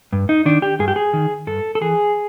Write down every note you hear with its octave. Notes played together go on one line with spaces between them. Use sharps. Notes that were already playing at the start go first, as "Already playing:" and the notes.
G2
D#4
D#3 D4
G4
G2 G#4
G4
G#4
D#3
G2 A4
A4
E3 G#4